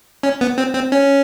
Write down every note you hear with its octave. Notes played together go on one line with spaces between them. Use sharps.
C#4
B3
C4
C4
C#4